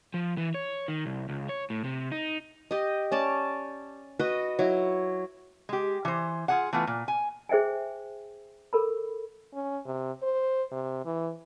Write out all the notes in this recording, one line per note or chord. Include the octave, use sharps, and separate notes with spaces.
F3
E3
C#5
D#3
C2
C#2
C#5
A2
C3
D#4
G4 D#5
C#4 D5 A5
F#4 B4 D#5
F#3 E4
G#3 G4
E3 C5
F4 G#4 F#5
E3 A3 B3 F4 B4
A#2
G#5
G#4 C5 E5 G5 G#5
A4 A#4 B5
C#4
C3
C5
C3
E3